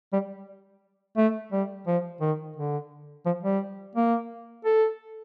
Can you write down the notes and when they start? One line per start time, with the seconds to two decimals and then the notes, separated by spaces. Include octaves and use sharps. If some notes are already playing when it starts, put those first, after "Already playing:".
0.13 G3
1.17 A3
1.52 G3
1.87 F3
2.21 D#3
2.56 D3
3.26 F3
3.43 G3
3.95 A#3
4.65 A4